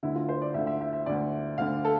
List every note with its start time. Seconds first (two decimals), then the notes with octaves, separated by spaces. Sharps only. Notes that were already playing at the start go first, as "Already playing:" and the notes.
0.03 D2 D3 E4
0.15 F4
0.29 C5
0.42 D5
0.54 D2 D3 E5
0.67 E5
0.81 E5
0.93 E5
1.06 D2 D3 D5
1.58 D2 D3 F5
1.85 A4